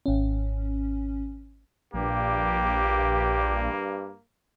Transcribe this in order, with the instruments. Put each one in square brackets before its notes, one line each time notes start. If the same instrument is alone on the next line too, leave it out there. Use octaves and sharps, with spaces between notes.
[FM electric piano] G#1 C#4
[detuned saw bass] A#1 [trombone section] G2 [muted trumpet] A#3 [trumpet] G4